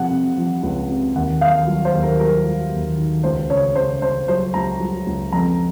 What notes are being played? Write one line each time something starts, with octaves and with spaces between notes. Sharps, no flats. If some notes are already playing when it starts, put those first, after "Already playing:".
Already playing: C3 F3 F#5
C3
F3
C#2
C3
D#2 F#5
D#2 F5
F#3
C5
D#2
A#4
F#3 A#4
F#3
D#2
D#3
C#2 C5
C#3 C#5
C#3 C5
C#3 C5
F#3 C5
C#2 A#5
F#3
C#2
F2 A#5